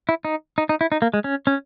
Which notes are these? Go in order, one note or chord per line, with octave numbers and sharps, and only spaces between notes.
E4
D#4
D#4
D#4
E4
D#4
A#3
G#3
C#4
C#4